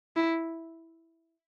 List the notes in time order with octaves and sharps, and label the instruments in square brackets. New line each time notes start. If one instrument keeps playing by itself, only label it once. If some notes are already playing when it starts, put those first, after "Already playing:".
[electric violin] E4